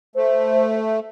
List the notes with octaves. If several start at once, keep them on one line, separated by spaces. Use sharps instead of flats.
A3 C5